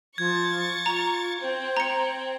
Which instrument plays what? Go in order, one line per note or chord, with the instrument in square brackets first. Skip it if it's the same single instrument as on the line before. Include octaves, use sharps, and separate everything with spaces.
[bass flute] F3 [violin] C#6 A6 [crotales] G#6
[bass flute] F4 [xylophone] A#5
[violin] C4 G5 [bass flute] C5
[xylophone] A#5 C#7